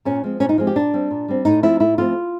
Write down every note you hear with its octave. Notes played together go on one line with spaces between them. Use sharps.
A#2 C#4
F3 G#3 C4
A#2 C#4
D#4
F3 G#3 C4
G4
A#2 D4
G3 C4
A#2
G3 C4
A2 D#4
F3 A3 C4 E4
A2 E4
F3 A3 C4 F4